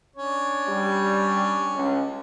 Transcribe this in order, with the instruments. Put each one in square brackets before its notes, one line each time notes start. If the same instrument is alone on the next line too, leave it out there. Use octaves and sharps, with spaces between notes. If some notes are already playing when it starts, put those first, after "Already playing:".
[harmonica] C#4 D4 C#5
[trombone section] G3
C#2